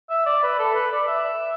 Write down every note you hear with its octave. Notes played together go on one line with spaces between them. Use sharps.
E5
D5
B4
A4
B4
D5
E5